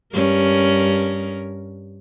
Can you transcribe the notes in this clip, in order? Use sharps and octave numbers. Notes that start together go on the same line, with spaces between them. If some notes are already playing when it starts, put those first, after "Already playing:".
G2 C#4 A#4